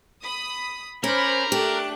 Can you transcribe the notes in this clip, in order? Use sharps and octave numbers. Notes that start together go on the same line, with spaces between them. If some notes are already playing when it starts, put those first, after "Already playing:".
B5 D#6
C#4 A#4 C5 B5 D6
A3 D4 G4 F#6